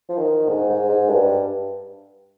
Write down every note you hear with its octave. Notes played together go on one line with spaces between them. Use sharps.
F3
D#3
G#2
G#2
G#2
G2